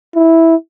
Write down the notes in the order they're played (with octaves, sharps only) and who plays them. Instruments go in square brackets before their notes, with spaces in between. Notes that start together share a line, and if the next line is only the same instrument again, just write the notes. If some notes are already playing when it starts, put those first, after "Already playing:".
[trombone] E4